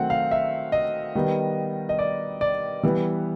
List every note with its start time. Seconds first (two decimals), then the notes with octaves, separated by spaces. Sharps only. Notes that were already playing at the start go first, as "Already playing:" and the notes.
Already playing: D#3 F#3 A3 C4 F#5
0.10 F5
0.31 E5
0.72 D#5
1.15 D#3 G3 B3
1.89 D#5
1.99 D5
2.41 D5
2.83 E3 G3 B3